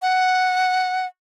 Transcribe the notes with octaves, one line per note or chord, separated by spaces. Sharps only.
F#5